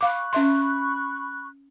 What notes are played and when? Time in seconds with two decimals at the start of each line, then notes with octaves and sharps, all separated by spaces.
0.01 F5 B5 C#6 D6 F#6
0.33 C#4 E5 C6